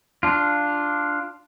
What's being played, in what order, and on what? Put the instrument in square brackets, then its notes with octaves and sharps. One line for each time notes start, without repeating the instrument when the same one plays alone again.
[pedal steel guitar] D4 F4